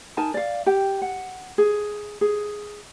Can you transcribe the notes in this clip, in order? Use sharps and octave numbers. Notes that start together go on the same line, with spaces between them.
D#4 A#4 G#5 A5
D5 F5
G4 G5
F#5
G#4
G#4